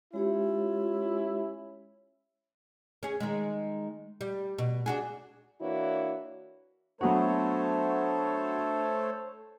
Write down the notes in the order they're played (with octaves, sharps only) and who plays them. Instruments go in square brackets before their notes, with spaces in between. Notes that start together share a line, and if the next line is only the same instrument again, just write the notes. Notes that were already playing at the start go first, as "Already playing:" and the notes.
[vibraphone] G#3 G4 C#5 [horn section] C#4 E4 [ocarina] F4
[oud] C#4 G#4
D#3 G#3
G3
B2
D4 F#4 G#4
[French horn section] E3 A#3 D4 E4 F#4 C#5
[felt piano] F#3 B3 F#4 [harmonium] A3 C5 C#5 [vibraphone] D4 [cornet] A4